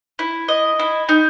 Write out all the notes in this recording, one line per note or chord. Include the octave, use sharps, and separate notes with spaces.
E4
D#5
E4
D#4